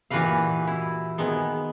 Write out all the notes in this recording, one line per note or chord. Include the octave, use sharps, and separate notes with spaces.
A#2 E3 F#4 G4 B4 F5
E4
D#3 G#3 B3